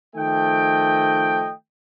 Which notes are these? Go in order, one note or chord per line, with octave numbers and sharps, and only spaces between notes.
D#3 F3 A3 D#5 G5